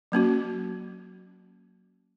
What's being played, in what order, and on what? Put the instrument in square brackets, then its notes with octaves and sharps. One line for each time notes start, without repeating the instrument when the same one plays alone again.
[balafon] F#3 A#3 C#4 F#4